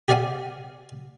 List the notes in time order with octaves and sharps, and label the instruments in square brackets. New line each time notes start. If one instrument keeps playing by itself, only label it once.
[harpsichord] G4 G#4 D5 F5 F#5 G#5